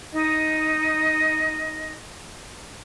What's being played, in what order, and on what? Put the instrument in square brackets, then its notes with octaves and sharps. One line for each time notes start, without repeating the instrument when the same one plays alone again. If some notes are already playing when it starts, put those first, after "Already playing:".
[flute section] D#4 D#5